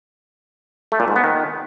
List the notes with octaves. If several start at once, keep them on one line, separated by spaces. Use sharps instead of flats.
A3
A#2
G#2
B3
D#3